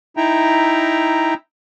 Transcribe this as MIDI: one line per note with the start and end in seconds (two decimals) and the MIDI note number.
0.17 1.34 63
0.17 1.34 64
0.17 1.34 76
0.17 1.34 79
0.17 1.34 82